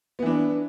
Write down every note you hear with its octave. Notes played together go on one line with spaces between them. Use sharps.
E3 B3 D4